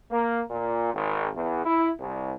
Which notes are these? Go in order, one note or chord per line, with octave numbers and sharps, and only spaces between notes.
A#3
A#2
G#1
E2
E4
C2